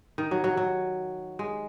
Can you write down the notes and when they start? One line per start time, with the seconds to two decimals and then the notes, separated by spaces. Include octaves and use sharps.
0.18 D#3
0.31 F#3
0.44 F#3
0.57 F#3
1.39 G#3